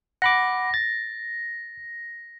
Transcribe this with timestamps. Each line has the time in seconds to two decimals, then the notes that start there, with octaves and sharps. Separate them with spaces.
0.22 F#5 B5 D6 A#6
0.74 A6